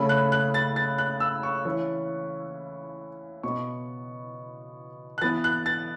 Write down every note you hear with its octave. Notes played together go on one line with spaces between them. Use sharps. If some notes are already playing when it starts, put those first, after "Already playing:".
Already playing: C#3 A3 C#4 B5
F#6
F#6
A6
A6
F#6
E6
C#6
E3 C#4
B2 B3 C#6
F#6
E3 B3 A6
F#6
A6